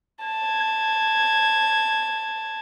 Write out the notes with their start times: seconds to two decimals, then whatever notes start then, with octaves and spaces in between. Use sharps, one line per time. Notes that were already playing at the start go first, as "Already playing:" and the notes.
0.25 A5 G#6